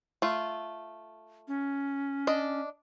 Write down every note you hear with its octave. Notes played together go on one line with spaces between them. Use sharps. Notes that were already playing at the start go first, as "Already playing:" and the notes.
A3 F4
C#4
D4 D#5